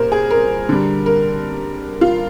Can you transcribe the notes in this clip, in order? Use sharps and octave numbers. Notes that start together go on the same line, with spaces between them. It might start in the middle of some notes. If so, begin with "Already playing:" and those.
Already playing: A#2 G3 A#4 C5
G#4
A#4
D3 G3
A#4
F4